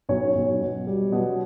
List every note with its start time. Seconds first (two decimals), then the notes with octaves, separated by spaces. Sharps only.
0.09 B1 C#5
0.35 B1
0.60 B2
0.87 G3
1.12 B2